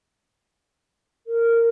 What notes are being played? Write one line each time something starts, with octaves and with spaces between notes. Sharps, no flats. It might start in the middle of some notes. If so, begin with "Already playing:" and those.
A#4